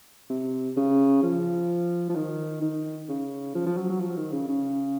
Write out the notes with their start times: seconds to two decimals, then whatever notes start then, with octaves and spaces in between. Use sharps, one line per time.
0.30 C3
0.77 C#3
1.23 F3
2.09 F3
2.16 D#3
2.62 D#3
3.09 C#3
3.55 F3
3.66 F3
3.77 F#3
3.90 F#3
4.00 F3
4.17 D#3
4.32 C#3
4.48 C#3